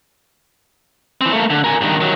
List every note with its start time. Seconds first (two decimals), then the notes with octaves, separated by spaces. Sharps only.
1.21 E3 C4
1.33 A3 A#3
1.50 D3
1.64 A#4 G#5
1.81 G2 D#3
2.00 D#3 F#3